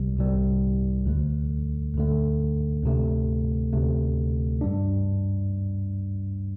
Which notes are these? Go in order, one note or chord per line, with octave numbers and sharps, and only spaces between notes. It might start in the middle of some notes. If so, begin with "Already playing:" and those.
Already playing: C2 C3 G3
C2 C3 G3
D2 D3 A3
D2 D3 A3
D2 C3 A3
D2 C3 A3
G2 G3 D4